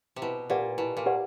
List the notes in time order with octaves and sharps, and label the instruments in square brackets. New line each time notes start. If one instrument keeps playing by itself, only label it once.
[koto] C3
[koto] B2 [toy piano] E4
[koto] A#2 [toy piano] G4 B4 D5 F#5
[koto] B2 [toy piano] E4
[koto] A#2
[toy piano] G4 B4 D5 F#5